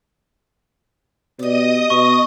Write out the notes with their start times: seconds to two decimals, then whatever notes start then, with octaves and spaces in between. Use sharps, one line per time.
1.39 B2 G4 D5 D#5 D#6
1.90 B2 C#6